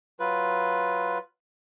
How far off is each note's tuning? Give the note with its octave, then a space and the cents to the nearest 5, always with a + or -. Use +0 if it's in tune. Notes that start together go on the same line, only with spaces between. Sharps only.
F#3 +0 F4 +0 B4 +0